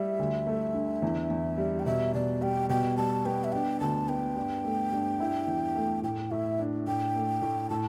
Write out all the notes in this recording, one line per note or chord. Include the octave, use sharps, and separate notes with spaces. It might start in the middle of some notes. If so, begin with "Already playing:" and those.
Already playing: G3 E5
D2
A3
D3
E2
E2
G3
G5
B2 E5
B2 D5
G3 G5
B2 G5
G3 A5
B3 G5
E5
D4 G5
D2 A5
B3 G5
G2
A3
G2
E4
E2
A3
A2 G5
A2 E5
D4
A2 G5
A3
A2
A2 A5